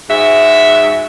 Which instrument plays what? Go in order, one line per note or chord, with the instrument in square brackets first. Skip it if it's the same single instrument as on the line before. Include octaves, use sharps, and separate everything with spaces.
[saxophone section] G#2 F#4 G#4 E5